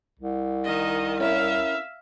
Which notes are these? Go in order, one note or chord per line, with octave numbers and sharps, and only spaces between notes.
C2
D#3 D#5
C#4 E4 A#4 E5 F5